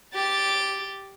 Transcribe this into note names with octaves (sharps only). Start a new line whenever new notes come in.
G4 A6